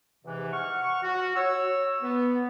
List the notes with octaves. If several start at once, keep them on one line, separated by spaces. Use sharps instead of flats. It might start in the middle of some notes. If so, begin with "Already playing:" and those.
E2 G#2 C3 E3
F#5 C#6 F6
F#4
C#5 E6
B3